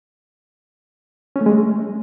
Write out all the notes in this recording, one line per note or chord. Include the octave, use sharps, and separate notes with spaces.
C#4
A3
G#3
A3